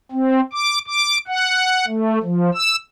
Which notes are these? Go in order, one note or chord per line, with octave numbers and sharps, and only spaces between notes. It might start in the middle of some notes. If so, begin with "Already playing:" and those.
C4
D6
D6
F#5
A3
F3
E6